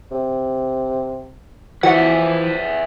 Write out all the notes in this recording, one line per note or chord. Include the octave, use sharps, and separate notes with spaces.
C3
E3 F3 F#4 B4 D5 E5